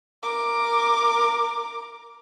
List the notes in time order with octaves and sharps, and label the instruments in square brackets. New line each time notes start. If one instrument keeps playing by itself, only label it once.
[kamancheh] A#4 D6